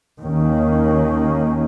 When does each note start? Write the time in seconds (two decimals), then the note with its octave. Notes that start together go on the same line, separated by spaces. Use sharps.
0.21 D#2 D#3 A#3 C#4